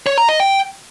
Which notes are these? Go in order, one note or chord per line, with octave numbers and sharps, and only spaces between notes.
C#5
A#5
D#5
G5